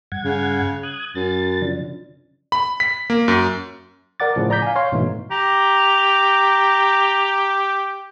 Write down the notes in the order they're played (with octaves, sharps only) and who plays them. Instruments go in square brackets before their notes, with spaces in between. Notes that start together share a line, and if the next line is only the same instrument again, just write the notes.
[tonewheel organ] G2 F#5 G#6
[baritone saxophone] C#3
[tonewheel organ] D#6 F#6 G#6
[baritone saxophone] F#2 [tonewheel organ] A6
[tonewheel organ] C#3 F3 D4
[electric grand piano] B5
B6
A#3
F#2
[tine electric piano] A#4 D5 F#5 D6 A6
A2 C#3 F3
D5 A#5 D6 G6 B6
F5 G#5
C#5 F5 C6
G#2 B2 E3 A3 D#4
[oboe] G4 [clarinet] A#5